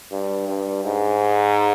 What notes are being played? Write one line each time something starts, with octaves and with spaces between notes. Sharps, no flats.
G2
G2
G#2